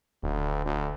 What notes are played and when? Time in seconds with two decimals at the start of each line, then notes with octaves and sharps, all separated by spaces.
0.23 D#1 D2
0.66 D2